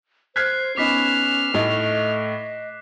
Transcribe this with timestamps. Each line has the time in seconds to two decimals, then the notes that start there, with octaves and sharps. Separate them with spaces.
0.36 C5 F6 F#6 G#6 B6 C7
0.77 B3 C#4 D#4 D6 F6 B6 C7
1.54 A2 A3 D#4 D#5